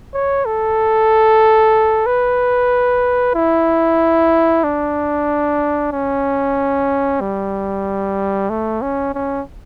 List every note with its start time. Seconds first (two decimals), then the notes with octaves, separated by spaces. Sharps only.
0.14 C#5
0.46 A4
2.06 B4
3.35 E4
4.64 D4
5.92 C#4
7.21 G3
8.50 A3
8.82 C#4
9.14 C#4